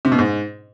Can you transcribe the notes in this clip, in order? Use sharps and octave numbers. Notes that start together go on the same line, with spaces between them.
C3
B2
G#2